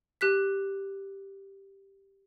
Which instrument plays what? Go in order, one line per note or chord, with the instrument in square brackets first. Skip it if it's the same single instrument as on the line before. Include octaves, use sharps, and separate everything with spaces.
[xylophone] G4 F#6 B6